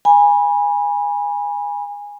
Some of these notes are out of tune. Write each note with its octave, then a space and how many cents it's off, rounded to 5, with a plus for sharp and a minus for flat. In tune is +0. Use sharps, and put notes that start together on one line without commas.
G#5 -20 B5 -25